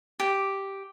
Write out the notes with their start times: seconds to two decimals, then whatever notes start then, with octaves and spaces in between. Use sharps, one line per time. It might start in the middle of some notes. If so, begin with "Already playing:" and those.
0.20 G4